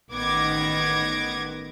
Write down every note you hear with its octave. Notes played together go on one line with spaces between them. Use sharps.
A1 D#3 B3 D6 G#6 A#6